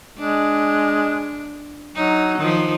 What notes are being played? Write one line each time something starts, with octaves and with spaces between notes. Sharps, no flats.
G#3 D4
F#3 D#4
D#3 F3